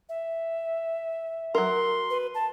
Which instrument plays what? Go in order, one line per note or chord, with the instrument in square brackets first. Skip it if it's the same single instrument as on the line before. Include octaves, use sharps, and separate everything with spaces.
[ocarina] E5
[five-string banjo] F#3 A#4 [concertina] C6
[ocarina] B4
A5